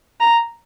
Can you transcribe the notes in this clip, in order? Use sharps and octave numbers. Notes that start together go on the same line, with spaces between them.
A#5